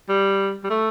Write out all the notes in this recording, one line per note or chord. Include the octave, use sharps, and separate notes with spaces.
G3
G3
A3